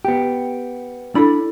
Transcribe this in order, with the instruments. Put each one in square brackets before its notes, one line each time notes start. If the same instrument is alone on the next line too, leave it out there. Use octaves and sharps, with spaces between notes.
[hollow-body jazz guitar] B3 G4
[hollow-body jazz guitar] D4 B5 [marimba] E4 A4